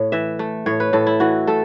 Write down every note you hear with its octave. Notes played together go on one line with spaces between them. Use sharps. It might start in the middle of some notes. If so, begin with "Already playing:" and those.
Already playing: A2 C#5
E3 E5
A3
A2 C#5
B4
A2 A4
E4
E3 F#4
A3 A4